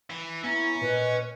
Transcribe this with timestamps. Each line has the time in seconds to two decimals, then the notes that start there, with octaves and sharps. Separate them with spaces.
0.10 E3
0.44 B3 C#4 E4 E5 A#5
0.81 A#2 A#4 B4 D#5